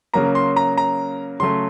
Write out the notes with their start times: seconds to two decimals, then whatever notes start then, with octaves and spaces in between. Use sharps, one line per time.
0.14 C#3 F#3 A#3 A#5
0.35 C6
0.56 A#5
0.77 A#5
1.40 C#3 F#3 A3 C6